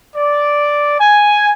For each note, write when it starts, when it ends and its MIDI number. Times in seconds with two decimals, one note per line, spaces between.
0.16 0.96 74
1.00 1.53 80